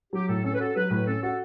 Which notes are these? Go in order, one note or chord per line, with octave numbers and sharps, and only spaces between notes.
F#3 G4
A2 A4
C#4 A4
B4
F#4 A4
F#3 B4
A2 B4
C#4 A4
F#4 A4